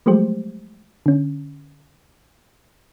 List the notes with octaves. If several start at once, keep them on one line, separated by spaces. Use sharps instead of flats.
F3 F#3 G#3 A3 G4 C5
D3 C#4